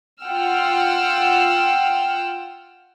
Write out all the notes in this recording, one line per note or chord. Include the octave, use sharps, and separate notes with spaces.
F4 F#5 G5 E6 F6